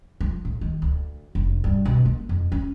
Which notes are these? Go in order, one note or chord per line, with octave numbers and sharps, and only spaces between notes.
F3
A2
D#3
D2
F1
G2
B2
A#3
F2
C#4